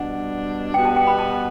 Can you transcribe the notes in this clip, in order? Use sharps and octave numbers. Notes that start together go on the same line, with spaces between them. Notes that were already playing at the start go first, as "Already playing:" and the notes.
Already playing: B2 G3 D4 F#5
B2 G3 B3 F#4 G5
A5
G5
B5
A5